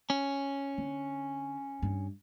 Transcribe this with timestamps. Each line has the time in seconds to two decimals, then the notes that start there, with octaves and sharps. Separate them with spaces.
0.10 C#4
0.78 D3
1.82 G2